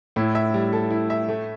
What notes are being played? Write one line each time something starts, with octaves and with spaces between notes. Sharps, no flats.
A2 E4
E5
G3
A4
E4
E5
A3